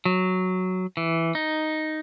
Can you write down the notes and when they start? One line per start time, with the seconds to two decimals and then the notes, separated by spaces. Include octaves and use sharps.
0.05 F#3
0.97 E3
1.35 D#4